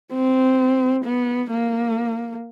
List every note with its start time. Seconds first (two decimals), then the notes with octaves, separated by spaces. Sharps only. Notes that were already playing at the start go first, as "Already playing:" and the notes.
0.12 C4
1.05 B3
1.51 A#3